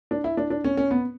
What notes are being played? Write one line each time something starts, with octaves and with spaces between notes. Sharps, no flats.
D4
E4
D4
D4
C#4
C#4
B3